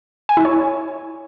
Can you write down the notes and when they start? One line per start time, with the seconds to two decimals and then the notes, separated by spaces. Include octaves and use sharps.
0.29 G#5
0.37 E4
0.45 C#5